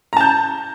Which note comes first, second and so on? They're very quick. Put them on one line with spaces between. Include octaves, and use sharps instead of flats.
A#5 A5 G6